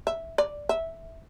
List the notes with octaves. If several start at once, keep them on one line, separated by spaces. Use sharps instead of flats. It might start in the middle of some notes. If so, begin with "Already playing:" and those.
E5
D5
E5